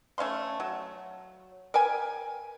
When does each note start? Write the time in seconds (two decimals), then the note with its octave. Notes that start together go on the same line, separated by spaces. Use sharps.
0.18 A3 C#4 F5 C6
0.60 F#3
1.74 A#4 B4 G5 G#5